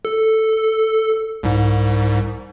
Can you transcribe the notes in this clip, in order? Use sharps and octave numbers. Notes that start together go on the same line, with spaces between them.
A4
C2 G#2